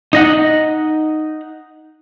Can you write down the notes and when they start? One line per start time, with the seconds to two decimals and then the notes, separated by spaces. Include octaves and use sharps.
0.13 D#4 D#5 F#5